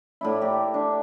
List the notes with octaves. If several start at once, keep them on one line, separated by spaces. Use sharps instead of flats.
A2 D4 E4
G4 A#4 D5
D4